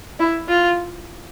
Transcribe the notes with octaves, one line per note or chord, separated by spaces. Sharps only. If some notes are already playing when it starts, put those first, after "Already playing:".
E4
F4